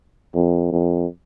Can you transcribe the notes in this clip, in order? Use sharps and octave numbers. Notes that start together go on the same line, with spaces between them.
F2
F2